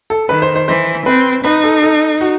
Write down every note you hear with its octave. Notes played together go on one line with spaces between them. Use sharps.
A4
D#3 B4
C5
C5
E3 C5
C4 B4
D#4 B4
A4
A4
F#4